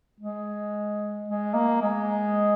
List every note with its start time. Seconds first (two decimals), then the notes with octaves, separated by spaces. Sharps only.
0.20 G#3
1.28 G#3
1.54 A#3
1.82 G#3